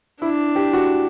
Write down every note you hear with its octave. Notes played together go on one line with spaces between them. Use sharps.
D4 E4
G4
F#4